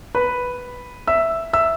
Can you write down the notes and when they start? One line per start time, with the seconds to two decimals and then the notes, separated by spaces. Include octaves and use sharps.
0.15 B4 B5
1.07 E5 E6
1.53 E5 E6